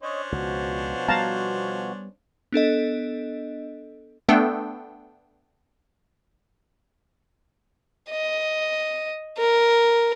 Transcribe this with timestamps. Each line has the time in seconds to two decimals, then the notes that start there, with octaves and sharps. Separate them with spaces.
0.03 C#4 D4 C5 C#5 D#5
0.32 C#2 B2 F3 F#4
1.08 G3 B3 F5 A5 A#5
2.52 B3 D4 A4 D#5
4.29 A3 B3 D4 A4 G5
8.10 D#5
9.38 A#4